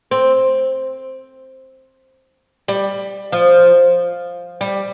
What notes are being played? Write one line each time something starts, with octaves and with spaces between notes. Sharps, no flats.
C4
G3
F3
G3